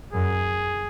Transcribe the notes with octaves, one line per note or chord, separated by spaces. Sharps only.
F#2 G#4